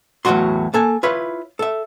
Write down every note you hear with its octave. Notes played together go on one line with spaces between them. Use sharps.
E2 A2 E3 F#3 F#4 C6
A#3 A4 G#5
E4 F4 B4 C#5
A4 E5